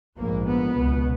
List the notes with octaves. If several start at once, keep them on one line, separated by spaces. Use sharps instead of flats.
A#1 G#2 A#3
B3
C#2 B2